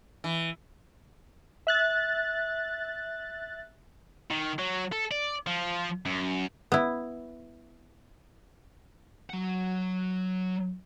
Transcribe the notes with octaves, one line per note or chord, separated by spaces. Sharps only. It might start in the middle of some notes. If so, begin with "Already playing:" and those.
E3
E5 F#6 A6
D#3
F#3
A4
D5
F3
F#2
B3 E4
F#3 F#5